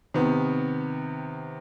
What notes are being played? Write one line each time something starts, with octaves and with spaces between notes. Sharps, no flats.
C3 D#3 B3